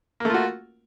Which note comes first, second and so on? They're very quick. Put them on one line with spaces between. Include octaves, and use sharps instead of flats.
A#3 A3 F4 F#4